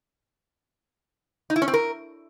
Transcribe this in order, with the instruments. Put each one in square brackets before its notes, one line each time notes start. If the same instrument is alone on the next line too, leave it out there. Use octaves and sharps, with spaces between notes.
[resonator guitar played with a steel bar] D#4
E4
C#4
C4
A#4